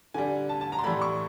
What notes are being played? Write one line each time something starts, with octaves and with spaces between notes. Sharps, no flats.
D3 G3 G#5
A5
A5
A#5
C6
A2 E3 G3 B5
C#6